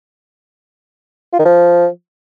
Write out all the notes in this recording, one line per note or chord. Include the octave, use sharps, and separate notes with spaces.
F4
D#3
F3